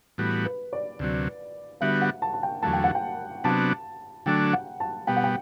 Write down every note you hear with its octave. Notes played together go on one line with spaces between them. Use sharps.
A2 E3 G3 B3 F#4
B4
D5
D2 C3 F#3
D3 G3 B3 F#4 E5
F#5
A5
A5
G5
E2 D3 F#3 A3 A5
G5
F#5
G5
C3 F#3 B3 D4 A5
D3 F#3 A3 D4 G5
F#5
A5
B2 G3 B3 G5
F#5
G5